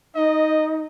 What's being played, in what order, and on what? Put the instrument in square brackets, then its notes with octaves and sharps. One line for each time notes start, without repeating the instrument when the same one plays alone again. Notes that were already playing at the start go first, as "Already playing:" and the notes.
[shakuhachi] D#4 [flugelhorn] D#5